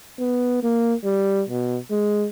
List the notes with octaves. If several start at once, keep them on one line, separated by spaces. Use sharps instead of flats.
B3
A#3
G3
B2
G#3